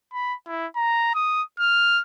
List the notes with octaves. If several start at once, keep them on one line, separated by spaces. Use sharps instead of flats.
B5
E4
A#5
D#6
F6